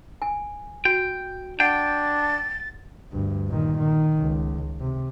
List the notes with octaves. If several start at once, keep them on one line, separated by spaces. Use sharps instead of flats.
G#5
F#4 G5
D4 F#5 G5 A6
D2 G2
A#2 D#3
D#3
C#2
C3